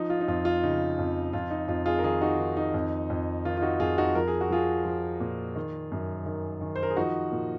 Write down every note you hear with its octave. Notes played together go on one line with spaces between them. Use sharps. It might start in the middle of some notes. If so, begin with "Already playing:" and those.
Already playing: F3 D#4
F4
D#4
F2 F4
F4
C#3 D#4
F2
F2 F4
D#4
F2 F4
F4 G#4
A#4
D#3 F4 G#4
D#4 F#4
D#3
D#4
F2
F2
D#3 F4
F4
D#4 F#4
F2 F4 G#4
D#4 F#4
F3 A#4
G#4
F#4
F3 F4 G#4
F3
A#2
D#3
F#2
D#3
D#3
C5
A#4
G#4
F3 D#4 F#4
A#2